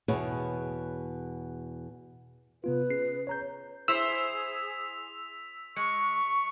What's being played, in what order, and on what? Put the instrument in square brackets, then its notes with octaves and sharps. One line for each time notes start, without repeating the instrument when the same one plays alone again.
[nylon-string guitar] E2 B2 G#4 C#5
[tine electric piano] C3 B3 F4 [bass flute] B4
[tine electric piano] C#4 G#4 C7
C#5 A#5 G6
[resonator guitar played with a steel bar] E4 C5 [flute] G#4 [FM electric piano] E6 [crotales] B6 F7
[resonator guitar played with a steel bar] G#3 [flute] C#6 [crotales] C#7